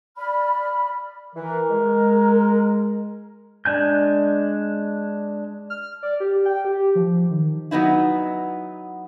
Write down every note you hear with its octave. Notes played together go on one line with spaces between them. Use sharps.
D5 B5 F6
E3 A#4
G#3
G#3 D4 G#5 G6
F6
D5
G4
G5
G4
F3
D#3
F#3 B3 D#4 E4